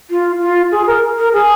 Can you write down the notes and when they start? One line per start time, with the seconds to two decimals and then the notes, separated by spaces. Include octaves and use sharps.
0.10 F4
0.41 F4
0.71 G#4
0.87 A#4
1.18 A#4
1.33 G#4